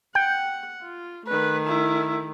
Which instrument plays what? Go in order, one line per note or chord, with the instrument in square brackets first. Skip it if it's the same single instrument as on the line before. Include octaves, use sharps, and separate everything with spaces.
[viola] F#5 [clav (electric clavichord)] G5
[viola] F4
[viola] D#3 A3 [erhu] B4
[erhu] E4